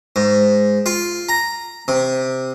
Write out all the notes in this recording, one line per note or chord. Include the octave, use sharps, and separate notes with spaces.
G#2
F4
A#5
C3